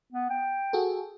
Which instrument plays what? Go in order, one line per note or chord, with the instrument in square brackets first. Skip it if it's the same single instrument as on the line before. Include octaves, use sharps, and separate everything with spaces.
[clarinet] B3
G5
[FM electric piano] F#4 G#4 A4